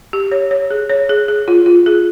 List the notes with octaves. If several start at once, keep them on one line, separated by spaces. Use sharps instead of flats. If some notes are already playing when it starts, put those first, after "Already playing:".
G4
C#5
C#5
G#4
C#5
G#4
G#4
F4
F4
G#4